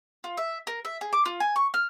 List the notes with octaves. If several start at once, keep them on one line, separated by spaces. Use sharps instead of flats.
F4
E5
A#4
E5
G#4
D6
F4
G#5
C#6
F6